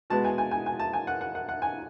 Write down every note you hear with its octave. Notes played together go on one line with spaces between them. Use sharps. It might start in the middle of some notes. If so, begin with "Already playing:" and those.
B2 G#3 B3 A5
G#5
G#5
G#5
G#5
A5
G#5
F#5
F#5
F#5
F#5
G#5